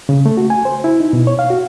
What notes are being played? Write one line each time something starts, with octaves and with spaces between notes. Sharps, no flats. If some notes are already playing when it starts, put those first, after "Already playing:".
C#3
A3
F#4
G#5
C5
E4
D#4
B2
C#5
F5
F#4